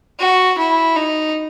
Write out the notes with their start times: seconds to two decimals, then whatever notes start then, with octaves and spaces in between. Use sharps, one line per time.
0.20 F#4
0.58 E4
0.96 D#4